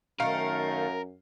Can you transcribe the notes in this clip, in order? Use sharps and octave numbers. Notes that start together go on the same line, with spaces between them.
F#2 D#3 A3 A#4 F5